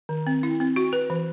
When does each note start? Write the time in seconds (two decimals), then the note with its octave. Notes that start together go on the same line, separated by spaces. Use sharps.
0.09 D#3
0.27 C4
0.43 E4
0.60 C4
0.76 F#4
0.93 B4
1.10 E3